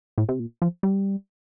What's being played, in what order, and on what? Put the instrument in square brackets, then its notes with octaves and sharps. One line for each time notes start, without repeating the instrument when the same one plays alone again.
[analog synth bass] A2
C3
A#2
F3
G3